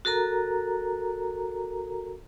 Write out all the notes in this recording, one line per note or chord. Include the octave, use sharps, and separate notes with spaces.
F#4 A4 A#4 A#5